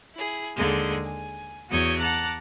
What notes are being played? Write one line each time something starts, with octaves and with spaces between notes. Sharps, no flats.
E4 G#4
D#2 D3 G#3 G#4 G6
G#5
E2 F#4 C#5 D#6 G6 G#6
F#5 A5 A#5 D6 F#6